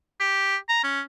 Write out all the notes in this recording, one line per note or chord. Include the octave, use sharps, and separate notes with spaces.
G4
A#5
C#4